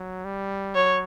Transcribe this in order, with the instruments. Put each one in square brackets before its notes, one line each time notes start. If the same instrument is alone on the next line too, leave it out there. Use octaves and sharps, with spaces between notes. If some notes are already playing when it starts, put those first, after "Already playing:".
Already playing: [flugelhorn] F#3
G3
[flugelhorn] F#3 [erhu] C#5